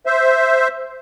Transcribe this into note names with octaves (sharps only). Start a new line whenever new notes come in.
C5 E5